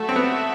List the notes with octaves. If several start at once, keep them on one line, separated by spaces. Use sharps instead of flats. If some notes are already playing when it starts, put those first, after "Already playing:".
Already playing: A3 F#4 A4 E5
C4
B3